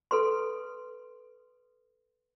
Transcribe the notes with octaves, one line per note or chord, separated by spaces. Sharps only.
A4 B4 C6